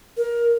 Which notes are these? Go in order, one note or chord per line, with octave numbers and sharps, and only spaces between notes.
A#4